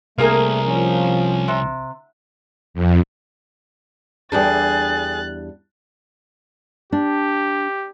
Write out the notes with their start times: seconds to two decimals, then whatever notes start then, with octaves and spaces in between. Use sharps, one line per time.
0.18 C2 A3 A#3 G#4 A#4
0.66 F3 C#4
1.48 C3
2.74 F2
4.32 E2 G3 D4 G#4 A4 G5 F#6 A6
6.92 D4 G4